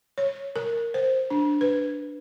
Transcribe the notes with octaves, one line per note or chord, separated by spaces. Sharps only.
C#5
A#4
C5
D4
B4